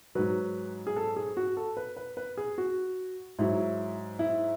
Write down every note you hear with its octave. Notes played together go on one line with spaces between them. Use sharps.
G#2 F#3 B4
G#4
A4
G#4
F#4
A4
B4
B4
B4
G#4
F#4
G#2 F#3 E4
E4